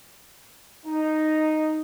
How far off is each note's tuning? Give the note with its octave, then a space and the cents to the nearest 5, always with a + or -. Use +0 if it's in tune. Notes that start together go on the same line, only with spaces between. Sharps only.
D#4 -5